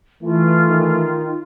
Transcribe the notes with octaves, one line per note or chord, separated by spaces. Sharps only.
E3 A3 F4
D#3